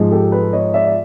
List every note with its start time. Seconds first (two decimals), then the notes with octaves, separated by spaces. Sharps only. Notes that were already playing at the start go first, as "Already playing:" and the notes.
Already playing: G#2 F3 G#3
0.11 G4 A4
0.31 A4 B4
0.53 C#5 D#5
0.74 D5 E5
0.86 D5